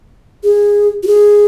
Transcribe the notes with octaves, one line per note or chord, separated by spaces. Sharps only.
G#4
F#4
G#4